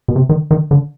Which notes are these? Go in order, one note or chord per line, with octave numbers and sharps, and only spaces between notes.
B2
C3
D#3
D#3
D3